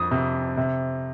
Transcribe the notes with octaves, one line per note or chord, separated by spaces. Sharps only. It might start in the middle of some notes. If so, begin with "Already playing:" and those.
Already playing: F2 D#6
C3
C3